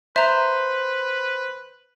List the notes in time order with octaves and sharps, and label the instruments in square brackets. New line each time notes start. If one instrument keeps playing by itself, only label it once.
[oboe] B4 [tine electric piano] C5 [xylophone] E5 A#5